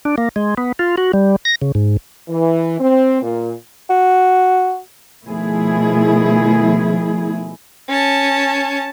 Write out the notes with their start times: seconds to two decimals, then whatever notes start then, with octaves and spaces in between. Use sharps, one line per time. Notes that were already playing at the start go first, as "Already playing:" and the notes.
0.05 D4
0.18 A#3
0.36 G#3
0.58 B3
0.79 F4
0.97 F#4
1.13 G3
1.45 A#6
1.62 C#3
1.75 G#2
2.28 E3
2.80 C4
3.22 A#2
3.90 F#4
5.26 B2 D#3 F3 A3 E4 G#4
7.89 C#4 A5